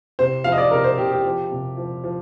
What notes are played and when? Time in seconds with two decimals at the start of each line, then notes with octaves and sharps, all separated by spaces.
0.19 C3 C5
0.44 F3 F5
0.52 D#5
0.58 D5
0.71 C3 A#4
0.84 C5
0.98 C3 G4
1.11 G4
1.25 F3
1.51 C3
1.77 F3
2.04 F3